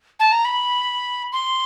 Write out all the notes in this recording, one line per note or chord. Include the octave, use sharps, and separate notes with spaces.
A5
A#5
B5
C6